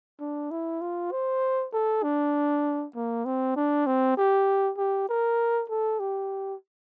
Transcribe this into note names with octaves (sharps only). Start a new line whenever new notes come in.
D4
E4
F4
C5
A4
D4
A#3
C4
D4
C4
G4
G4
A#4
A4
G4